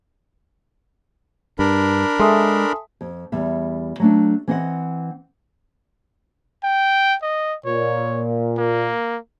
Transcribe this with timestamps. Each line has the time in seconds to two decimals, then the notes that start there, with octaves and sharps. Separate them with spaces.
1.59 G2 D4 A#4 B5
2.19 G#3 A4 E5 G#5 A5 C6 D#6
3.01 F2
3.32 E2 G3 E5
4.00 F#3 A3 D4
4.48 E3 C4 D#5 F#5
6.64 G5
7.22 D#5
7.65 A#2 C#5
8.58 A#3